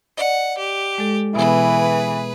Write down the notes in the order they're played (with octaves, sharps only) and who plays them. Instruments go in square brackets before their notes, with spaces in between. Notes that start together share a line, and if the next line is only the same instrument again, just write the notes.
[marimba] D5 D#5 [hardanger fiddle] F#5
[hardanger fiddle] G4
[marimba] G#3 A4
[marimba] B2 B3 [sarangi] E3 [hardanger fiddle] G#4 B4